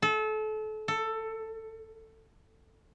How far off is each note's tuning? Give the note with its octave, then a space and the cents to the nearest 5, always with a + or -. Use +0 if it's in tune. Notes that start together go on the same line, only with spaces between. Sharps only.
A4 -30
A4 +15